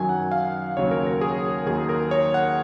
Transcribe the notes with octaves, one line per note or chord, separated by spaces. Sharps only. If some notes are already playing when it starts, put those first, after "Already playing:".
Already playing: F#2 D#3 F#3 G#5
F#5
F5
D#2 C#3 F#3 C#5
A#4
A#4
G#4
D#2 D#3 F#3 G#4
A#4
C#5
F#5